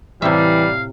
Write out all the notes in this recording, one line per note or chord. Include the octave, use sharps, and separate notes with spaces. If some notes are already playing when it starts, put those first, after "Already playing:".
A2 C3 E3 G3 E5 F5